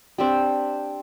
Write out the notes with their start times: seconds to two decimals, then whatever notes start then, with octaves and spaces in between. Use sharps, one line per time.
0.18 C4 D4 G4